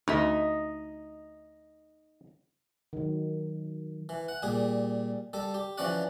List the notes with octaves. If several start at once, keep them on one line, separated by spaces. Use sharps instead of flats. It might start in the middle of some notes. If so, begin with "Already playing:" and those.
D2 D#4 D#5 E5
D#3 F#3
E3
F#5
A#2 G3 G#4
G3 A4
G4
E3 F3 C#4 D5 F#5